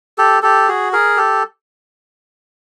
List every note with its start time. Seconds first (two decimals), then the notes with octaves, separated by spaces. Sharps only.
0.18 G4 A4
0.42 G4 A4
0.68 F#4 G#4
0.93 G#4 A#4
1.17 G4 A4